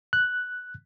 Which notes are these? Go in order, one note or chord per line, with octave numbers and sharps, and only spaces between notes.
F#6